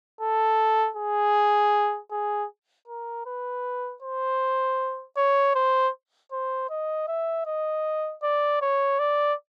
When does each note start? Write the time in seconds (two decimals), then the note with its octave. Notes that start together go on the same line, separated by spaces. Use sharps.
0.21 A4
0.97 G#4
2.11 G#4
2.88 A#4
3.26 B4
4.02 C5
5.17 C#5
5.55 C5
6.32 C5
6.70 D#5
7.08 E5
7.46 D#5
8.23 D5
8.62 C#5
8.99 D5